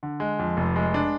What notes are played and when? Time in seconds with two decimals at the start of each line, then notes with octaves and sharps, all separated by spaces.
0.03 D3
0.20 G#3
0.39 F2
0.57 F1
0.76 G#3
0.94 D4